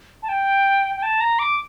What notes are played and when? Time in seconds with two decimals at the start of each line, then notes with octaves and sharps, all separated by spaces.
0.23 A5
0.29 G5
0.96 G5
1.03 A5
1.20 A#5
1.39 D6